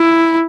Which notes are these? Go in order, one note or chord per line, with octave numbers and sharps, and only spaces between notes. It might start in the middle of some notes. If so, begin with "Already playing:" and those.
Already playing: E4